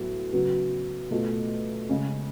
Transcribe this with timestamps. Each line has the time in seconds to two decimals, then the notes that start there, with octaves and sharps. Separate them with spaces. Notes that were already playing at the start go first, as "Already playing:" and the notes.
Already playing: A2 F#3 B3
0.32 C#3 F#3 B3 F#4
1.11 B2 A3 F4
1.89 C#3 G#3 C#4